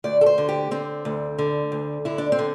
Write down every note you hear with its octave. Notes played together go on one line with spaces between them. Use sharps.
D2 D5
A4
C5
D3
G4
D3 C4
D2
D3
D2
D3 E4
D4
C4
D3